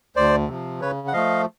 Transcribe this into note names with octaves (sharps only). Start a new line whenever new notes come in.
D2 C5 D5
C3 F3
C#3 B4 C#5
F#5
F3 A3 D#5 F5